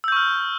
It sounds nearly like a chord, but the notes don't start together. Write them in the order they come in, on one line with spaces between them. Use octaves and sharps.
E6 G6 C#6 F6